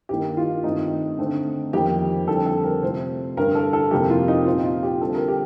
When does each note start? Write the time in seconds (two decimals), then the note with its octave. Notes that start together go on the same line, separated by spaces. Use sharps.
0.09 G2 D#3 A#3 G4
0.37 F4
0.64 G2 D#3 A3 C4 D#4
1.19 D3 A3 C4
1.73 F2 D#3 A#3 G4
2.28 F2 D3 G3 C4 A4
2.46 A4
2.64 A#4
2.82 C3 F3 A3 C5
3.37 G2 D3 G3 A#4
3.55 A4
3.73 A4
3.91 F2 C3 F3 A#3 G4
4.10 F4
4.28 D#4
4.46 A#2 F3 C4 F4
4.64 F4
4.83 G4
5.00 D3 G3 C4 A4
5.15 A#4
5.28 G4